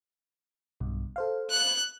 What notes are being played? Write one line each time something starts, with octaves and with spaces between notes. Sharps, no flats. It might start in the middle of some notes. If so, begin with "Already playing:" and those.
B1 G2 B2
A4 C5 F5
F#6